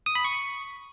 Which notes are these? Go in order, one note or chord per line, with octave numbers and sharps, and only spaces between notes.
D#6
B5
C#6